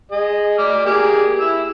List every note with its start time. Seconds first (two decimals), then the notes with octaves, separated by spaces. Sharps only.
0.12 G#4 D#5
0.58 D5 D6 F6
0.86 A#3 G4 G#4
1.40 E4 E6